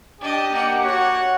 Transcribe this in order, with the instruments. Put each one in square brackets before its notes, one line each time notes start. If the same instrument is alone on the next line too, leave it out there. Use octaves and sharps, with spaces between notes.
[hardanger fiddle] D4 D#5 [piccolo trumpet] G4
[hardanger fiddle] A#3 F#5
[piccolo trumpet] F#4 [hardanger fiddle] C#5 F#5